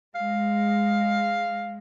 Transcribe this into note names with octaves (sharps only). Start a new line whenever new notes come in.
G#3 F5